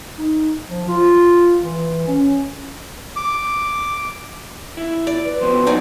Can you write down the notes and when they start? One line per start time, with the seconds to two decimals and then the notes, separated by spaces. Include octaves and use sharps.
0.19 D#4
0.68 F3
0.88 F4
1.61 E3
2.08 C#4
3.16 D6
4.77 E4
5.07 D5
5.24 B4
5.41 F3 B3 F#4 C5
5.67 F#3 D#4 D5 G#5